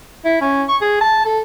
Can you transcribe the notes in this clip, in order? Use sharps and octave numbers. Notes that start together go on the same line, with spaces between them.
E4
C#4
C#6
G#4
A5
A4